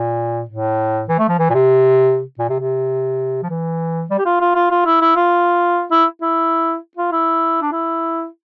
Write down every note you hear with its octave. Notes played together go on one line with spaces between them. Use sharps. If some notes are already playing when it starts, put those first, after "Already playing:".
Already playing: A#2
A2
E3
A3
F3
E3
A#2
C3
A#2
C3
C3
F3
E3
G3
G4
F4
F4
F4
F4
E4
E4
F4
E4
E4
F4
E4
D4
E4